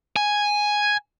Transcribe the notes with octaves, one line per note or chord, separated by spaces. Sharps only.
G#5